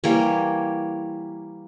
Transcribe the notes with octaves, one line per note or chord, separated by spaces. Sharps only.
E3 G3 A#3 C#5